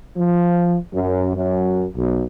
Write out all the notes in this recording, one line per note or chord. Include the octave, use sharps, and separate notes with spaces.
F3
F#2
F#2
B1